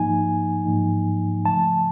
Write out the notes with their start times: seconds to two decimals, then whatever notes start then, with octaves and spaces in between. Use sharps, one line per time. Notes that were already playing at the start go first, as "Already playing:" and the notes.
Already playing: G#2 F3 A#3 D#4 G#5
0.65 G#2 F3 A#3 D#4
1.45 C#3 F3 A3 A5